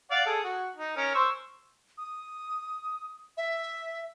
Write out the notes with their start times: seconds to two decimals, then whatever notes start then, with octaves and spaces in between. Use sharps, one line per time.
0.11 D5 F5 F#5
0.26 G#4 A4
0.44 F#4
0.76 D#4
0.97 C#4 A#4
1.15 C5 C#6 E6
1.98 D#6
3.37 E5